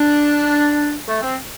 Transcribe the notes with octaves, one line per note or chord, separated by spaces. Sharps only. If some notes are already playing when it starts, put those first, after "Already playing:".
Already playing: D4
A3
C4